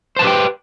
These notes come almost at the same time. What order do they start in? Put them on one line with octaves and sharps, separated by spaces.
C5 A5 B4 G4 G5